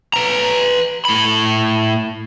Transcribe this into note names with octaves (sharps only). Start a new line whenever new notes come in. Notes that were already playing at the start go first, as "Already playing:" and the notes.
B4 A#5
A2 B5